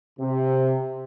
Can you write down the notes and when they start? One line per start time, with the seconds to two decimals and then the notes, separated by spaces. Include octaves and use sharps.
0.20 C3